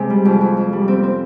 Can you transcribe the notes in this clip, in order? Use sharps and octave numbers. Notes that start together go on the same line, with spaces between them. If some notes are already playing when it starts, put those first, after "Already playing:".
Already playing: C3 G#3
G3
F2
F2
F2
G3
C4
C4